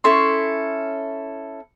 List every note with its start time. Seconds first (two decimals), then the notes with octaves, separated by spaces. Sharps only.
0.04 C#4 E4 A4 C6